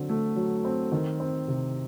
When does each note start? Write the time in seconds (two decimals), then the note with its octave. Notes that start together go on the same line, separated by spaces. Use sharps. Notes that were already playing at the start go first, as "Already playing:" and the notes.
Already playing: D3 F#3 C4
0.09 A3
0.36 F#3
0.65 C4
0.92 D#3
1.20 C4
1.48 C3